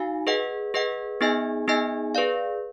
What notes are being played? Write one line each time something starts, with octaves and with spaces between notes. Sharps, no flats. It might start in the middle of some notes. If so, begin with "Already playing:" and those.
Already playing: D#4 F#4 F5 G#5
G#4 B4 D#5 F#5
G#4 B4 D#5 F#5
B3 D#4 G#4 D#5 G#5
B3 D#4 G#4 D#5 G#5
G#4 B4 D5 F5